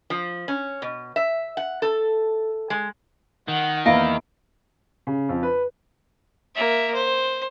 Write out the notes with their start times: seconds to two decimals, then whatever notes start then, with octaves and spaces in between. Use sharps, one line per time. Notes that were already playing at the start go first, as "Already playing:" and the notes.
0.10 F3
0.48 C#4
0.82 B2
1.16 E5
1.57 F#5
1.82 A4
2.70 G#3
3.48 D#3 F#5
3.86 E2 A#3 E4 D#5 F5 D7
5.07 C#3
5.29 F2
5.43 B4
6.55 A#3 E5
6.94 C5